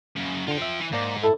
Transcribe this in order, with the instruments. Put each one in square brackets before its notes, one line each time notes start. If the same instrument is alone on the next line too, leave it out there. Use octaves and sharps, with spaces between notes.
[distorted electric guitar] F#2 C#3
[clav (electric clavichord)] D3 [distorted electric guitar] F4 G5
[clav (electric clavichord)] E5
[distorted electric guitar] E3
[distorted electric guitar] G#2 [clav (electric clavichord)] A#3 D5 A#5
[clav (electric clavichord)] E4 [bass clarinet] A4